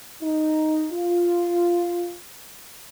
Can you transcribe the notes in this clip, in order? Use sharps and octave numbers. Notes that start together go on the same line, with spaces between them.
D#4
F4